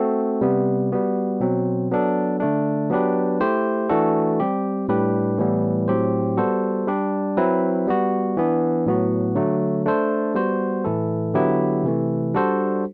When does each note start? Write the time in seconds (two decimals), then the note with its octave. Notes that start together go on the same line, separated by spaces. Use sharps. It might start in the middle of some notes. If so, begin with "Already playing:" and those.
Already playing: A3 C4 F#4 A4
0.41 C3 G3 B3
0.92 G3 B3 F#4
1.40 B2 F#3 C4
1.91 F#3 B3 D4 A4
2.40 D3 A3 D4
2.90 F#3 B3 D4 G4 B4
3.40 A3 E4 G4 C5
3.89 E3 A3 D4 F#4 A4
4.40 G3 C4 G4
4.88 A2 G3 D4 G4 B4
5.38 A2 E3 G3 B3
5.88 A2 F#3 C4 G4 C5
6.37 G3 B3 F#4 A4 C5
6.87 G3 D4 G4
7.37 F#3 C4 E4 B4
7.87 G3 B3 F#4
8.37 E3 B3 D4
8.86 A2 F#3 B3 F#4
9.35 D3 F#3 A3
9.86 A3 D4 A4 C5
10.35 G3 B3 F#4 C5
10.84 A2 E3 A3 E4 A4
11.34 D3 F#3 B3 E4 G4
11.84 C3 E3 A3
12.34 G3 D4 F#4 A4 C5